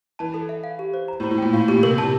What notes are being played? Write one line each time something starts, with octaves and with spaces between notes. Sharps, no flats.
E3 A5
A4
E5
F5
G4
C5
A#5
A2
C5
A2
A#2 G5
A2 F5
A#2 G4
C3 A#4
C3 A5